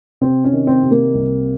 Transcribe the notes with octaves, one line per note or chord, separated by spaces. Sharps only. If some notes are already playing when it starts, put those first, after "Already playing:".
C3 C4
C#4
D#3
C4
C3
A#3
C2